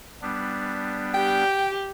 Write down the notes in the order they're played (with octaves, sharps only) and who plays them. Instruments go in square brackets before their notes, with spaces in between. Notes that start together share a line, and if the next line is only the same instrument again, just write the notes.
[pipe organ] G3 B3 D4
[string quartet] G4 [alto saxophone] G5